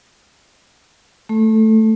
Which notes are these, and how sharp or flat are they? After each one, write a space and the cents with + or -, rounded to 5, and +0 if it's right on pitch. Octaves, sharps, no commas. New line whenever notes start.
A3 +0 A4 +0